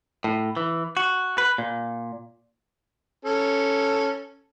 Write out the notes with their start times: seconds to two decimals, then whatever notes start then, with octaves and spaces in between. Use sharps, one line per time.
0.24 A2
0.57 E3
0.97 F#4
1.38 B4
1.58 A#2
3.25 C#4 A4